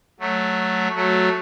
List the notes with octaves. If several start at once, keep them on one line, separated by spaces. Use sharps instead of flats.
F#3 A3
F#3 A3